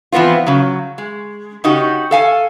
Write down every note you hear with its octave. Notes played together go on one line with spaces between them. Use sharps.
E3 F3 B3 C4 F4
C#3 F#3
G#3
C#3 D#4 F#4 G4
A4 F5 G#5